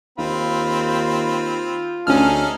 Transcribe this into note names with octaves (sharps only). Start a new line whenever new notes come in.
D#2 C4 F4 B5
D2 C#4 D#4 G#4 A4 F6